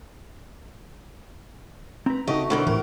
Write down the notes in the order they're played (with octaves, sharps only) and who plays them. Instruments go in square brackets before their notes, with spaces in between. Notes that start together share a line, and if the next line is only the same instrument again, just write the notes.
[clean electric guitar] C4 B4 [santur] A#5
[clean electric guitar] C#3 D#4 [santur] A3 F#4 [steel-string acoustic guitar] G4 D#5
[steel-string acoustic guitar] B2 D3 D5 [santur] E4 F#4 A#4 [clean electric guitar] C5 B5
[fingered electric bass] A2 E3 [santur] F#4 B4 [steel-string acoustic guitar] A#4